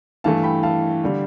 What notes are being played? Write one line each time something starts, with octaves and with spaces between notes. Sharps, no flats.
G2 E3 A3 F5 A5
G5 B5
F5 A5
D3 G3